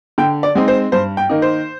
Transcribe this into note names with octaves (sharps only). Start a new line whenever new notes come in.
D3 G5
D5
G#3 C4 D#4
C5
G2 C5
G5
D#3 A#3 D#4
C5